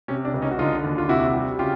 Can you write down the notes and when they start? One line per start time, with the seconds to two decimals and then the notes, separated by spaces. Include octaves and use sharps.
0.08 C3 C#4
0.25 D4
0.34 C#2
0.42 C#4 D#4
0.51 F#4
0.59 D3 D#4 F4
0.84 D#2
0.98 F4
1.09 C3 E4 F#4
1.34 G3
1.59 C#3 F4 G4